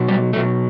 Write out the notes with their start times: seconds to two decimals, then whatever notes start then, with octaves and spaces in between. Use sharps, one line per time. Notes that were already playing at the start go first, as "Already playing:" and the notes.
Already playing: B2 F#3
0.08 G3
0.33 B2 F#3 A3